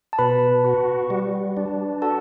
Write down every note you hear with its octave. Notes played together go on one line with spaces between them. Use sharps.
A5
B2 B4 B5
F#4
G3
D4
F#4 A4 A5